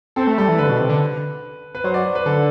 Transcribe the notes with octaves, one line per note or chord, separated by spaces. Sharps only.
C4 A4
A3
G3 A4
E3
D3 B4
B2
C3
D3
B4
F#3 C5
D5
B4
D3 A4